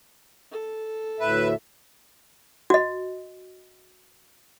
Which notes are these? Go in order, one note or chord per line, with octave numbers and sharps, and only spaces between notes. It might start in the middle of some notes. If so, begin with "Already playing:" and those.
A4
D2 A2 B4 E5
F#4 D#5